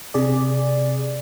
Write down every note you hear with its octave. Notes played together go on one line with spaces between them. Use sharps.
C3 G#4 D5